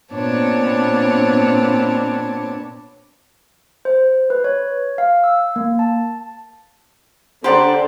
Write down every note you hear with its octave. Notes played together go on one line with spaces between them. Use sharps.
A#2 B3 C4 D4 C#5 A5
C5
B4
C#5
F5
E6
A#3
A5
D3 G4 C5 D5 F#5 A#5